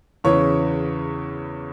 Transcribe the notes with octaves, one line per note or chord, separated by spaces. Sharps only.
E2 C#3 E3 C#5